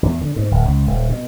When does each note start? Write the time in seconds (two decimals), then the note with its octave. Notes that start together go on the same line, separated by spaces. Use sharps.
0.03 E2
0.21 D3
0.36 G#2
0.51 D1
0.65 C#2
0.87 D#1
1.09 B2